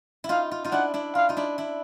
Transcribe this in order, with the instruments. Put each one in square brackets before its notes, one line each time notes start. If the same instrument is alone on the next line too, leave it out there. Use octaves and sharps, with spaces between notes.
[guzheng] E4
[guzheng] D#4 F4 [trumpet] F5
[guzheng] F4
D#4 F4
[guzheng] D4 E4 [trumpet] F#5
[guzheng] D4 E4
[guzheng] F4 [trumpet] F5
[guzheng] D#4 F4
D4 E4
D4 E4